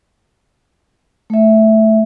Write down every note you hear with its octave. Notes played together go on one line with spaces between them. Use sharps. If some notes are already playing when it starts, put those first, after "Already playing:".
A3 E5